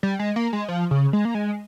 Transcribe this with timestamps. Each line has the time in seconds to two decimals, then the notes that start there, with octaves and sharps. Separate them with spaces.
0.03 G3
0.19 G#3
0.36 A#3
0.53 G#3
0.68 F3
0.91 C#3
1.13 G#3
1.25 A#3
1.35 G#3